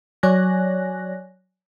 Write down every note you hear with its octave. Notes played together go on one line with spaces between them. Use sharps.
F#3 C#5 D5 G#5 F#6 A#6